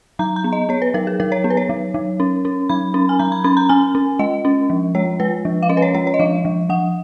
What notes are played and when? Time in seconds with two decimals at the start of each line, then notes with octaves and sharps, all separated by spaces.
0.19 F#3 A#5
0.36 A#5
0.44 B3
0.53 D#5
0.69 B3 C#5
0.82 B4
0.94 F#3 A#4
1.07 G#4
1.20 F#3 A#4
1.32 C#5
1.44 B3
1.50 B4
1.57 C#5
1.69 F#3
1.94 F#3
2.20 C#4
2.45 C#4
2.69 F#3 B5
2.94 C#4
3.09 G#5
3.19 F#3 A#5
3.32 B5
3.44 C#4 B5
3.57 A#5
3.69 C#4 G#5
3.95 C#4
4.19 G#3 D#5
4.45 C#4
4.70 F3
4.95 G#3 C#5
5.20 G#3 B4
5.45 F3
5.63 F5
5.69 C#4 D#5
5.77 B4
5.82 C#5
5.94 G#3 C#5
6.07 C#5
6.14 D#5
6.19 F3 F5
6.45 F3
6.69 F3 F#5